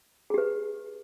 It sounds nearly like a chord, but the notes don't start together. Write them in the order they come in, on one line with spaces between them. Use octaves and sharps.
G#4 G4 B4